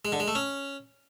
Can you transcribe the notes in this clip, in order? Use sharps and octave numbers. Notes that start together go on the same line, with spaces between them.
G#3
D3
G#3
A3
C#4